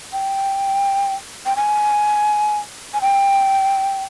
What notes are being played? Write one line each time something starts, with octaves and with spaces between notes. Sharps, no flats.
G5
G5
G#5
G#5
G5